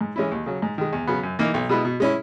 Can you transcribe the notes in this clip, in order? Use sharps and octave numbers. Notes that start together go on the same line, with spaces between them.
G#2
E3 G#3 C#4 E4
D#2
C#3 F#3
G#2
D#3 G#3
E2
C#3 F#3 B3
F#2
E3 A#3 D#4
B1
B2 G#3 B3 E4
B2
G#3 C#4 E4